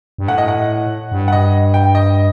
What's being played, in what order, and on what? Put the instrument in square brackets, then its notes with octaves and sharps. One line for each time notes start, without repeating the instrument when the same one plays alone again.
[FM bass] G2
[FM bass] A2 [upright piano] F#5
[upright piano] D#5
F#5
[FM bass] G2
[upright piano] F#5
D#5
G5
D#5